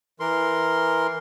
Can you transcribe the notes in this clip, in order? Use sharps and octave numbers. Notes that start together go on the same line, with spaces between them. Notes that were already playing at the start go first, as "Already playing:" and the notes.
E3 A#4 C6